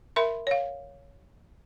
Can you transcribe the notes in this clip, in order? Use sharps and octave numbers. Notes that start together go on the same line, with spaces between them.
A#4 E5 B5 C6
C#5 F5